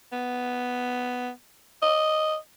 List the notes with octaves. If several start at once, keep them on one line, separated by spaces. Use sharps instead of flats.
B3
D#5